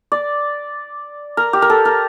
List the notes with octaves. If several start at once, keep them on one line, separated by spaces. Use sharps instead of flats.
D5
A#4
G4
A#4
A4
A#4